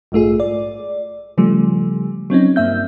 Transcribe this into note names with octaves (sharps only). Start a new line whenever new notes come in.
A#1 G#2 A3 F4 G#4
D5
C#3 F3 G3 A3
F#3 C4 C#4 D#4
G2 A#3 E5 G6